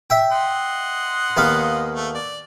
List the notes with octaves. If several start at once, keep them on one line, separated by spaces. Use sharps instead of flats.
E5 G5
D#5 F#5 C6
D#2 B3 F5
A3
D5